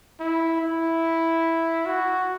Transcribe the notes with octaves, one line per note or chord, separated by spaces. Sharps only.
E4
E4
F#4